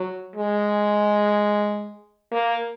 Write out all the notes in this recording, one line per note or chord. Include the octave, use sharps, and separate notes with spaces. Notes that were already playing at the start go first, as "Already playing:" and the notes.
Already playing: F#3
G#3
A#3